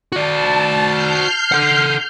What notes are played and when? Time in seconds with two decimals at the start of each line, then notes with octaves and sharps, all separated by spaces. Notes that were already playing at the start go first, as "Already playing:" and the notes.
0.12 F#4 D5 A5
0.85 F6 G6 C7
1.52 A4 F#5